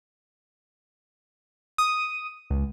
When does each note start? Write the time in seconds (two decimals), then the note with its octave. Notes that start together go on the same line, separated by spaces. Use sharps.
1.78 D#6
2.50 C#2